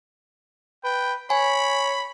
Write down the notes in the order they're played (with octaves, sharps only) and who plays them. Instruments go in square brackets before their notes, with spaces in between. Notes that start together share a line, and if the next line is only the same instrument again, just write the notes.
[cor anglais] B4 [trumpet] G5
[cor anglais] C#5 [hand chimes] G#5 [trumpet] B5